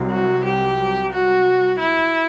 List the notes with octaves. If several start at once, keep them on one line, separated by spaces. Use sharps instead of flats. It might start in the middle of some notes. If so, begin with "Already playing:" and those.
Already playing: C2 C3 F#3
F#4
G4
F#4
E4